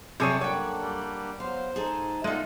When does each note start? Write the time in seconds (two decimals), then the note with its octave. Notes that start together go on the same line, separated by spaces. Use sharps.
0.20 F#2 C3 G3 G#4 A4 C#5
0.41 A#3 D4 C#5 F#5 G5
0.82 G3
1.40 F#3 B3 C5 F5
1.76 G#2 D#4 G#4 A4
2.24 G#3 A3 B3 D#4 F4